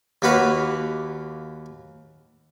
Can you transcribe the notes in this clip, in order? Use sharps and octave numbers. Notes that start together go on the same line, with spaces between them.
D#2 A#3 F#4 B4 F5